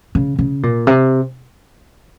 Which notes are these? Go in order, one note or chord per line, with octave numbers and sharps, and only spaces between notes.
C#3
C#3
A#2
C3